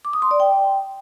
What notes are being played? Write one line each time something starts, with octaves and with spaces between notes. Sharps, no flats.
D6
D#6
C6
D5
G5